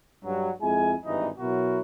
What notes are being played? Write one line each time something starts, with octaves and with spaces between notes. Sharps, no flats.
G2 F#3
F2 G#3 E4 G#5
G#1 G2 E3 D#4
B2 F#3 E4 F#4 A#4